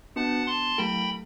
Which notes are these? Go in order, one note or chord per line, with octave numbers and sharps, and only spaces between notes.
B3 D4 F#4 B4 F#5 A5
A5 C6
F#3 A3 E4 A4 G5 B5